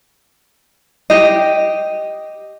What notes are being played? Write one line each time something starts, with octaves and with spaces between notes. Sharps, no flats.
G4 D#5